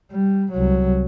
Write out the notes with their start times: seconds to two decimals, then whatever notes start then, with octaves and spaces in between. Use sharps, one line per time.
0.12 G3
0.52 C2 F#3